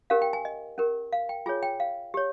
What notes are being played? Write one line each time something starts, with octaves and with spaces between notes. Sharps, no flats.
C#4 G4 A#4 F5
G5
G#5
D#5
C#4 G4 A#4
F5
G5
F4 G#4 C#5 G#5
G5
F5
G4 C#5